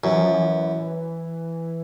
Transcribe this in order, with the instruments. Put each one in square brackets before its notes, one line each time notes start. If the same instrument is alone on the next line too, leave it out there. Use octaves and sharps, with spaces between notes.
[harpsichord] F#2 [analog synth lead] E3
[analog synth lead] F3
E3